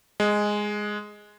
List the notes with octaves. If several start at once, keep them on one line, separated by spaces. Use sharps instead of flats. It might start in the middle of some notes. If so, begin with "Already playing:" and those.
G#3